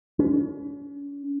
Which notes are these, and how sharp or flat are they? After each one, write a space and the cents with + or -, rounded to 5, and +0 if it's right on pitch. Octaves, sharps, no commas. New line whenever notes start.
C#4 +40